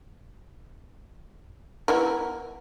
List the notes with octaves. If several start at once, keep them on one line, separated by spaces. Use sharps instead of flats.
B3 E4 A#4